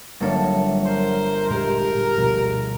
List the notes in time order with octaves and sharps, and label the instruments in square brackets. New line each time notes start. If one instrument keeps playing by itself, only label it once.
[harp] G1 A#3 D4 [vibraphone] F#3 C#5 E5
[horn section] A#4 C5
[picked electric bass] A#2 G#3 [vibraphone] G4 G#4 [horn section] A#4
[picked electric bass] B2 F3